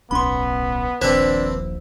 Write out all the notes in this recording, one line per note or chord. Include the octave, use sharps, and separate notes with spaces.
D1 B1 B3 C#4 B5 C6
D#1 A#1 D#2 C4 D4 B4 C5 E6